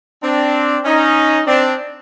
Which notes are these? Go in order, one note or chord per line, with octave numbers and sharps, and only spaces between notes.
C4 D4
C#4 D#4
C4 D4